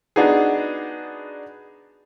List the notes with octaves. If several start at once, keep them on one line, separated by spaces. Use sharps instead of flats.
B3 D4 D#4 F#4 G#4